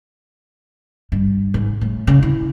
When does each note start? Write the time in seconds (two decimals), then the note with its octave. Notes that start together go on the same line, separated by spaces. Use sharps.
1.12 G2
1.54 G#2
1.81 A2
2.07 C#3
2.23 E4